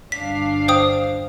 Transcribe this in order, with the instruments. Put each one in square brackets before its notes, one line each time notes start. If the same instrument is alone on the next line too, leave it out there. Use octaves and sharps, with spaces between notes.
[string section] G1 D4 F5 [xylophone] B6
[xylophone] C5 G5 D#6